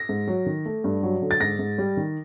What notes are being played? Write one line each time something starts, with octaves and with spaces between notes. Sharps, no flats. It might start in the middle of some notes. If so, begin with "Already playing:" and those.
Already playing: A#6
G#2
F#3
D#3
A3
G2
F#3
D3
A6
G#2 A#6
G#2
G3
D#3